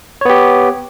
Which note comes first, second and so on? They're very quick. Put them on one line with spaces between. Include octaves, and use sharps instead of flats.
C#5 B3 G4